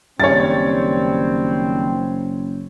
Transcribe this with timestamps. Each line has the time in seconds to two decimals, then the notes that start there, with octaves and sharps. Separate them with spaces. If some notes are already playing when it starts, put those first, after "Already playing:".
0.20 F#1 D#3 G3 C4 C#5 A6